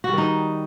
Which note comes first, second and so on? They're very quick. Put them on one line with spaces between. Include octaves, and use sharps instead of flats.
F#4 G3 D#3 D#4